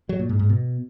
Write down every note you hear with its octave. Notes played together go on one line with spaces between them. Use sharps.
F#3
A#2
G#2
G#2
B2